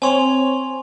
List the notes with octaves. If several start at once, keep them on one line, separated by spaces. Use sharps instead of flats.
C4 C#5 G#5 C6 F7